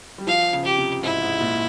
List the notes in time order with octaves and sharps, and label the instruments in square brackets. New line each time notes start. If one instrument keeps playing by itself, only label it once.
[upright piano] G3
[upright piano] F3 [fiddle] F5
[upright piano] C#3
[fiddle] G4
[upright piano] C3
[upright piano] G#2 [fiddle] E4
[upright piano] G#2
A#2